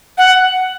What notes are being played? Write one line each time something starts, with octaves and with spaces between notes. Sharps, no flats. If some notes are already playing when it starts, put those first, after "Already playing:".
F#5